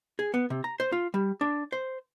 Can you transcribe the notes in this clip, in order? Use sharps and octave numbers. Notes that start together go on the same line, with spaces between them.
G#4
B3
C3
A#5
C5
F4
G3
D4
C5